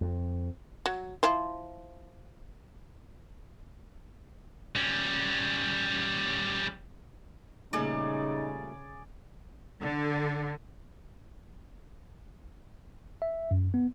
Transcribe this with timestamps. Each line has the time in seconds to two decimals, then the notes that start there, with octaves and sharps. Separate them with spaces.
0.01 F2
0.86 F#3
1.23 F3 E4 C5
4.76 G3 C#4
7.73 A#2 C#3 G3 A3 D#4 G#4 D5
9.82 D3
13.22 E5
13.51 F#2
13.74 B3